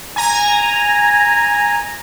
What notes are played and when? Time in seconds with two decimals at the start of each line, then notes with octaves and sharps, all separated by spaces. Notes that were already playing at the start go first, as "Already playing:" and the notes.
0.16 G#5 A#5